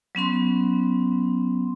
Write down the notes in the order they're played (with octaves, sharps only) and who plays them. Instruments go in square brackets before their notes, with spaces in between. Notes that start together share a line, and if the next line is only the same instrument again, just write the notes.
[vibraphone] F#3 B3 C#4 C6